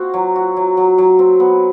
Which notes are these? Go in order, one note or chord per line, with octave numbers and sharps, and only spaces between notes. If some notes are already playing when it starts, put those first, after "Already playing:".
Already playing: C4 F#4
F#3
F#4
F#3
F#3
F#3
C4
B3